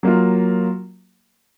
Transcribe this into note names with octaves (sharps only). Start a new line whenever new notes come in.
F#3 A#3 F4